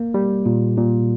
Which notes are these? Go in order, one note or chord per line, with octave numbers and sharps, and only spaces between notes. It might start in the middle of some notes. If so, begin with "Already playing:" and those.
Already playing: A#3
G3
A#2
A#2